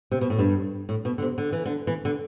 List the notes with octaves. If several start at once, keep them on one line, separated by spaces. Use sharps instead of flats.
C3
B2
A2
G2
A2
B2
D3
C3
D3
E3
D3
E3
D3